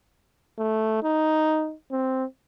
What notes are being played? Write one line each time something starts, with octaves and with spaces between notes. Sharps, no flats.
A3
D#4
C4